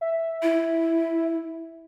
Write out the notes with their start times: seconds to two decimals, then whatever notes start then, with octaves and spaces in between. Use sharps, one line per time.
0.01 E5
0.43 E4